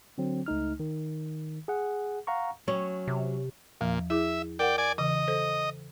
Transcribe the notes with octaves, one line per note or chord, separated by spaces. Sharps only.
D3 F#3 C4
C#2 A3 D#4 F6
D#3
G#4 F#5
F5 F#5 A#5 C#6
F#3 C#4
C3
E2 A#2 F3
E4 G#4 E5 D6
A#4 D5 F#5 G5
D5 G#5
C#3 E3 D#5
A4 C5